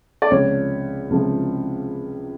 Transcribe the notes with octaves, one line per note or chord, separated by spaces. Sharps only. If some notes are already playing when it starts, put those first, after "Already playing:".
D5
C#2 C3 F3 C#5
C#2 C3 F3